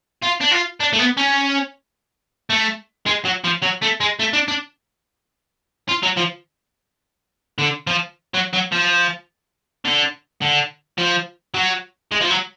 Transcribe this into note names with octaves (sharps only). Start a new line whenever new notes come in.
F4
D4
F4
D4
A3
B3
C#4
A3
G#3
F#3
F3
F#3
A3
G#3
A3
D4
D4
F4
F#3
F3
D3
F3
F#3
F#3
F3
D3
D3
F3
F#3
G#3
F3
F#3